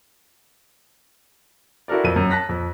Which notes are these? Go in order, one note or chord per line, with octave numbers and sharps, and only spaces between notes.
E4 F#4 A4 A#4 D5
F2 D#7
F#2
A5 F#6 A#6 B6
F2